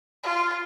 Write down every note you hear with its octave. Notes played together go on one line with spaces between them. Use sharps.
F4